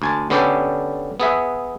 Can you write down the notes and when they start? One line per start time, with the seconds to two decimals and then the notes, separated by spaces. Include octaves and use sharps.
0.02 D2 G#5 A5
0.30 D3 B3 C#4 G4 A4 D5
1.20 B3 G#4 E5